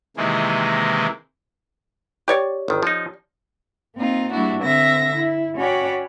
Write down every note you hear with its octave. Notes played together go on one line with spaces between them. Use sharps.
C3 D#3 E3 G#3 A#3
G4 C#5 D5
G1 D#3
F3 D#4
A#3 C4 D#4 F4
G3 A#3 D4 E4 F#4
D3 C4 E5 A#6
E4
C#4 F#4 C#5 D5 G5 B5